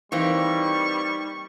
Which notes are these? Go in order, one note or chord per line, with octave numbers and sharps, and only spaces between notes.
E3 G3 A#3 C4 D#4 C#6